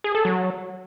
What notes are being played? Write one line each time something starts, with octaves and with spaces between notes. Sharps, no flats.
G#4
A4
F#3